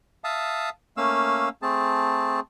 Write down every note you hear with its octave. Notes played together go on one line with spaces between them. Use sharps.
E5 F5 A5 D#6
A3 A#3 C#4 F5 E6
A3 C4 G#4 A5